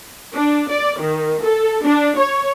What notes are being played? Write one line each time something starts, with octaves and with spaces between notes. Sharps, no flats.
D4
D5
D#3
A4
D4
C#5